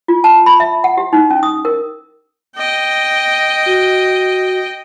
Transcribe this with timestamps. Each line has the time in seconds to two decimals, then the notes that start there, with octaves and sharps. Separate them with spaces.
0.08 F4
0.24 A5
0.46 B5
0.60 E5
0.84 F#5
0.97 G4
1.13 D#4
1.30 C#4
1.43 D#6
1.65 A#4
2.56 D#5 G5
3.66 F#4